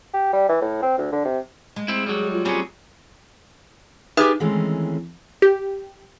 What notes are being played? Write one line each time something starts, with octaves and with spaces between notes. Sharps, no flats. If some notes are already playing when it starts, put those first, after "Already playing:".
G4
G3
E3
A2
C4
D2
D3
C3
G#3
C4 E4
F#3 G3 G#4
F4
F#3 G3 C4 C#4 G#4
D#4 G4 G#4 B4 E5 D#6
D#3 E3 G#3 A3 C4 C#4
G4